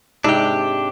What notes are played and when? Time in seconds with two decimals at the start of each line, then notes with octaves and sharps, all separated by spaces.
0.24 G#2 C3 D4 G4